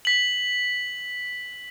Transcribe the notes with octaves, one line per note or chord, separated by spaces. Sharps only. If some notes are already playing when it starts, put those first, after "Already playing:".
B6 F#7